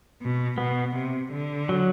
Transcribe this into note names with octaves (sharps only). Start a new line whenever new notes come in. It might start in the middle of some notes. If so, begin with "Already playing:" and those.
B2
B2 B3
C3
D3
F#3